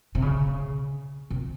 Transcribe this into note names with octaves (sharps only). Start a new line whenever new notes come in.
C3
C#3
C3